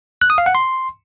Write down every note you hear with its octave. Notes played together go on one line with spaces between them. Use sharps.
F#6
D#6
F5
F#5
C6